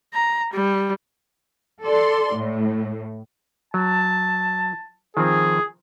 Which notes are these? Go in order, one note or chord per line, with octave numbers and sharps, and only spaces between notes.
A#5
G3
A4 D5 C6
A2
F#3 A5
D#3 F3 C4 G#4